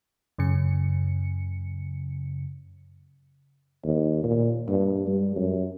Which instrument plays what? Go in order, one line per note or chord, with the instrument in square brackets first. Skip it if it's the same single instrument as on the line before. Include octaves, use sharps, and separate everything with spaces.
[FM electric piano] F#2 C#3 C#7
[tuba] D#2
A#2
G2
G3
F#2